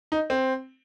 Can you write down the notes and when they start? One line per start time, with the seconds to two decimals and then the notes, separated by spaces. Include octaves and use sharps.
0.12 D#4
0.30 C4